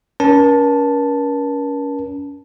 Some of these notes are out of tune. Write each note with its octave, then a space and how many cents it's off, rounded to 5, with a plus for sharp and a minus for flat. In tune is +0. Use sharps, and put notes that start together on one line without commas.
C#4 +30 A#4 +40 A5 +0